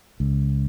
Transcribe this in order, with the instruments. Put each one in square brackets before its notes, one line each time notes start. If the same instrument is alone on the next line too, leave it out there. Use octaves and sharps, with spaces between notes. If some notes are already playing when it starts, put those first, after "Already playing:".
[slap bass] C#2